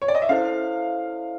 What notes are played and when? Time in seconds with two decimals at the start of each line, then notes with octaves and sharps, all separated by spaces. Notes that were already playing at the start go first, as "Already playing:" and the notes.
0.02 C#5
0.08 D5
0.15 D#5
0.22 E5
0.29 C#4 E4 A4 C5 F5